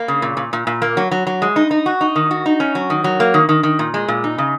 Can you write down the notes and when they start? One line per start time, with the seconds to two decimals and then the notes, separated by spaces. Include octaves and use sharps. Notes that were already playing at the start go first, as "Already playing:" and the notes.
Already playing: A#3
0.08 C#3
0.22 A#2
0.37 A#2
0.53 A#2
0.67 A#2
0.82 A#3
0.97 F#3
1.11 F#3
1.27 F#3
1.42 G#3
1.56 D#4
1.71 D#4
1.86 F#4
2.01 D#4
2.16 D#3
2.31 F#4
2.46 D#4
2.60 C#4
2.75 F#3
2.90 D#3
3.04 F#3
3.20 A#3
3.34 D#3
3.49 D#3
3.63 D#3
3.79 A#2
3.94 G#3
4.08 A#2
4.24 D#4
4.38 C#3